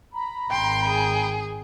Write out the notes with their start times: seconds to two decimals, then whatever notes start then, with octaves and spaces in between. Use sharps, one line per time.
0.13 A#5 B5
0.51 G#1 G5 C6
0.86 G#4